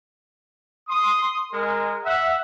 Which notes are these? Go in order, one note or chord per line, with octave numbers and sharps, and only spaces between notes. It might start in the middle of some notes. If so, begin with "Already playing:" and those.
C6 D#6
G#3 A#4
E5 F#5